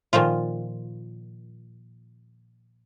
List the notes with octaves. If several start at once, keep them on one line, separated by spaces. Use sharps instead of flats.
A#2 D#3 F3 F4